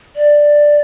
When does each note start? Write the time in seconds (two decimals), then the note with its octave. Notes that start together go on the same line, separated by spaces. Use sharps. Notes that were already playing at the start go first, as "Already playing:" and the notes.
0.15 D5